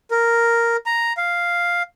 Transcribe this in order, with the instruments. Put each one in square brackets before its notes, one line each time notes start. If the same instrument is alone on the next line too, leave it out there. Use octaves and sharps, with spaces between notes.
[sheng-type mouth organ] A#4
A#5
F5